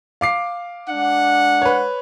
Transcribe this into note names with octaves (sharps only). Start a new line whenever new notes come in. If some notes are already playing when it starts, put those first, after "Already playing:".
F5 D6 C7
G#3 D4 F#5
B4 C#5